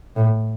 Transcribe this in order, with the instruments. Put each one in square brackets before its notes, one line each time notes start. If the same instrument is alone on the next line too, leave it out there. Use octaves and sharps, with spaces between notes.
[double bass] A2